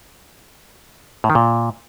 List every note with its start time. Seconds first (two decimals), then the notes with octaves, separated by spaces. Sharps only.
1.24 A2
1.30 D#3
1.35 A#2